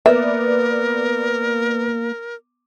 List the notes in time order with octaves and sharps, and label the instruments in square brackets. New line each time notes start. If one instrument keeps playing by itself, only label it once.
[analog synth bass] A#3 [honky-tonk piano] B3 D5 [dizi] A#4 [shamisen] E5